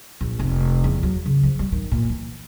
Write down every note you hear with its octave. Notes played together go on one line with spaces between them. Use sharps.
A#1
F1
E2
F#3
C#3
F3
G3
D#3
A#2
E3